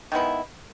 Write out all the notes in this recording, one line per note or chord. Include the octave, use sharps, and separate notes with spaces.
D#3 G#3 B3 E4